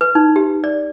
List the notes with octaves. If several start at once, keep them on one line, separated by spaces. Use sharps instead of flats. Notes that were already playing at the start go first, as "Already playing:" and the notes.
B4
D#4
G4
D5